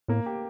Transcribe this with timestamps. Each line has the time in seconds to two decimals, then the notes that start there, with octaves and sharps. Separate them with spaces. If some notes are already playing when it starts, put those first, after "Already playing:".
0.08 A2 A#3
0.26 G4